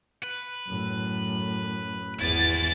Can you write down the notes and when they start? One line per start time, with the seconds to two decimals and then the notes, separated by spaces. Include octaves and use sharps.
0.23 B4
0.68 F#2 A2
2.20 G#1 E2 E4 G#4 A6